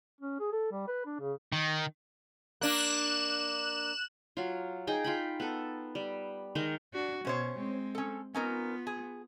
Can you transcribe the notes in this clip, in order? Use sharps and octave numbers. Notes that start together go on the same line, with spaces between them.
C#4
G#4
A4
G3
B4
D4
C#3
D#3
A#3 D4 F#6 E7
F#3 F4
D#4 G#4 G5
F4 G5 B5
B3 A4
G3
D#3 G#3 D#4 A#4
D4 F#4
B2 C#4 C5 C#5
G#3 C4
C#4 A4
B3 C#4 D#4 F4 A#4
G#4